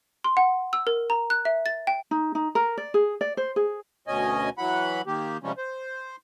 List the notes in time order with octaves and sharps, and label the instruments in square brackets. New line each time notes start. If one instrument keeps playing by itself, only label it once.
[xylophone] C6
F#5
E6
A#4
A#5
F#6
E5
A6
G5
[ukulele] D#4
D#4
A#4
D5
G#4
D5
C5
G#4
[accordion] D2 B2 C#4 D#5 G#5
E3 F#3 F#5 B5
D#3 A#3 G4
C3 F3 G3 G#3 C#4
C5